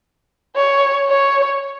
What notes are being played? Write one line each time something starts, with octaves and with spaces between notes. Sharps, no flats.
C#5
C#5